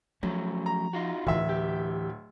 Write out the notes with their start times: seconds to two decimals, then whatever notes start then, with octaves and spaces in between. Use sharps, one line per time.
0.23 F3 F#3 A3 C#4
0.66 A#5
0.93 D#4 F4 F#4
1.27 D1 D3 E3 E5
1.49 G4